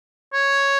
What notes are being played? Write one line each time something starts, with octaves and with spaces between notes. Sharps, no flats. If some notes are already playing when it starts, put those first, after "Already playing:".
C#5